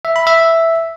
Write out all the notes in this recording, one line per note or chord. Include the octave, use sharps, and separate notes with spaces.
E5
B5
E5